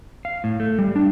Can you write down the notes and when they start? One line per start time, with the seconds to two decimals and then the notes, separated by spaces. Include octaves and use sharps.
0.25 F5
0.44 A2
0.60 A3
0.79 G3
0.96 D4